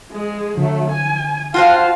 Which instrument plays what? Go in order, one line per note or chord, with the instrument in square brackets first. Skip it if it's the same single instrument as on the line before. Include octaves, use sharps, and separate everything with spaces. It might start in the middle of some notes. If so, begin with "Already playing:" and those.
[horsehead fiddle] G#3 G#4
[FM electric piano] D3 [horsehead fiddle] F#3 A3
[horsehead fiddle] G#5
[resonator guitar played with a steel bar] F4 F#4 C5 [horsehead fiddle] F5 A5 [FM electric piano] G5